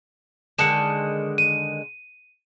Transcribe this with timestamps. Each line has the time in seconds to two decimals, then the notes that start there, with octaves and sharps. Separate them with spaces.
0.59 D3 D#3 G#3 C#7 E7
1.38 D#7